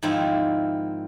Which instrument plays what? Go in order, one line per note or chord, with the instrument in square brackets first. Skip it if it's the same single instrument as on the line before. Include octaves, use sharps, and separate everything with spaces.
[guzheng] G#2 D#3 F3 C4 E4